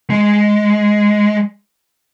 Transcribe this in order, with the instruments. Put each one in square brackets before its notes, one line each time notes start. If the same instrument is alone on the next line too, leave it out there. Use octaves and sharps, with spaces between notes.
[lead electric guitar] G#3